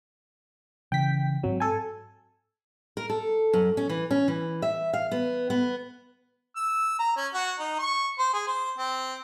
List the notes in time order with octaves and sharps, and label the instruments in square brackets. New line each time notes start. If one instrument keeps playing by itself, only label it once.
[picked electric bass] C#3 E3 [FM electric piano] G5 B6
[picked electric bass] G#2 C4 [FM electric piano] F#3
[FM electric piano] A4 G#5
[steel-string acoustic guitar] A#4
A4
F#2
C#4
E3
C#4
E3
E5
F5
B3
B3
[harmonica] E6
A#5
C#4
F#4
D#4
C#6
C5
G#4
C5
C4